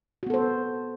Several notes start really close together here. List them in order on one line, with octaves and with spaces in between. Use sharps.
F#4 B3 A4 C5